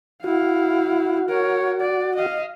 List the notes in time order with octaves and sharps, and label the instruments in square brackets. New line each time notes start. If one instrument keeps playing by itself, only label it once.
[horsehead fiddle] E4 F5 [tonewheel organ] F#4
[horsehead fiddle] A#4 C#5
D5
D#5 F5